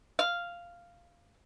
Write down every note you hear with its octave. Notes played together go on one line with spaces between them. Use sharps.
F5